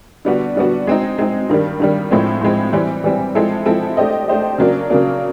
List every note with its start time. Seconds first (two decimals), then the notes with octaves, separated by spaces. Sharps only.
0.25 D3 G3 B3 D4 F#4
0.56 D3 G3 B3 D4 F#4
0.87 G#3 C4 D#4
1.18 G#3 C4 D#4
1.49 G2 D#3 G3
1.80 G2 D#3 G3
2.11 A2 F3 G#3 C4
2.41 A2 F3 G#3 C4
2.73 E3 G3 C4
3.04 E3 G3 C4
3.35 F3 G#3 C4 E4 A4
3.66 F3 G#3 C4 E4 A4
3.97 A3 D4 G4 C5 D#5
4.28 A3 D4 G4 C5 D#5
4.58 C#3 F#3 A#3 D4
4.90 C#3 F#3 A#3 D4